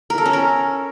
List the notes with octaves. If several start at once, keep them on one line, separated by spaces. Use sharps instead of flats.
A#4
A4
C#4
A#4